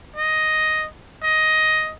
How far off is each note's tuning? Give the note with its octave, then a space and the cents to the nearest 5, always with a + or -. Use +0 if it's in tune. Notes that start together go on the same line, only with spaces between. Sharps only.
D#5 +5
D#5 +10